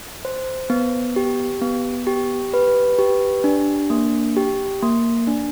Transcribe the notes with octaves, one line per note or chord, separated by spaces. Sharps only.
C5
B3
G4
B3
G4
B4
G4
D4
A#3
G4
A#3
D4